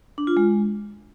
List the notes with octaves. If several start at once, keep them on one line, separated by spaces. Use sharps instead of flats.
D4
F4
G#3